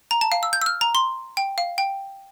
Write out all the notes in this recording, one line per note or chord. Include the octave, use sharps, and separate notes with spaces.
A#5
A5
F5
E6
G6
E6
F6
A#5
C6
G5
F5
G5